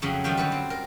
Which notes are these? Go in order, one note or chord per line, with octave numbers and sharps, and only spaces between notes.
F2 C#3 F#3 C#5
D#3 F3 G3 F#4 F5 G5
D3 F#3 G3 B4
C4
A#4